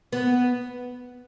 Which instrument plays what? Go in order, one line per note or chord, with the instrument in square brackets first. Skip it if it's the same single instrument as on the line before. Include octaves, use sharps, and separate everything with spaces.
[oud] B3